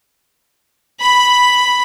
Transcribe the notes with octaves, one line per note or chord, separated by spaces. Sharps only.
B5